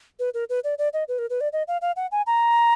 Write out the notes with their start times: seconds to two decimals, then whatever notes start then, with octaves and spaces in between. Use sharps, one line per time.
0.19 B4
0.34 A#4
0.49 B4
0.64 D5
0.78 D5
0.93 D#5
1.08 B4
1.18 A#4
1.30 B4
1.41 D5
1.53 D#5
1.68 F5
1.81 F5
1.96 F#5
2.11 G#5
2.27 A#5